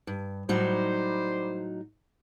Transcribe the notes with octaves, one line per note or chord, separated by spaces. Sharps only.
G2
A2 F#3 G3 D#4 C5